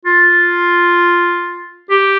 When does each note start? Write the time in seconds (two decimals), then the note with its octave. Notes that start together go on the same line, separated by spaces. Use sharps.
0.05 F4
1.90 G4